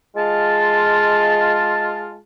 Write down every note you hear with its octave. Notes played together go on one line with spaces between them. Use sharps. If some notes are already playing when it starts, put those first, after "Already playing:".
G#3 F4 A5